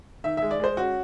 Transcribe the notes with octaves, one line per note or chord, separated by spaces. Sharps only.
D#3 E5
G#3 E5
D5
G#3 C5
C#4 F#4